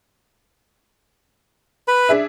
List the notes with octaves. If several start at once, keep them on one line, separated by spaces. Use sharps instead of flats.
B4 B5
D4 G#4 E5